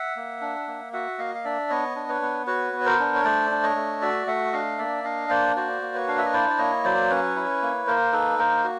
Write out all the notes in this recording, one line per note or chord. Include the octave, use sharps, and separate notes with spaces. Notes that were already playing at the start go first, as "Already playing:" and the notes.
Already playing: E5 F#5
A#3
D4
A#3
F#4 E5 F#5
A#3 D#5 F5
F5
D4 D5 E5
B3 C#5 D#5
D4
B4 C#5
B3
F#4 B4 C#5
B3
C#5
A#4 C5
D4
C#5
A3 C5 D5
D4
C#5 D#5
A3
F#4 D5 E5
A3 E5 F#5
D4 D#5 F5
A#3 D5 E5
D4 D#5 F5
A#3 C5 D5
F#4 C5 D5
A#3
B4 C#5
D4 F5
E5
D#5
E4 C5 D5
D5
A#3 C#5 D#5
F#3 C5 D5
C#4 B4 C#5
E4
A#3
A#3 A#4 C5
D#4 A4 B4
A#3 A#4 C5
F#4